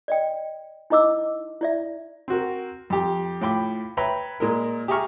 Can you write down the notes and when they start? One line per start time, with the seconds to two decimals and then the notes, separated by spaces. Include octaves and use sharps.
0.08 D5 D#5 G5
0.90 D#4 E4 D#5 D6 E6
1.61 E4 D5 E5
2.28 C4 F#4 A#4
2.90 F2 G4
3.41 A2 F4 G5 B5 D6
3.97 B4 C#5 E5 G5 A#5 B5
4.40 A#2 G#3 A#4
4.88 G4 G#4 E5 A#5 C#6 F6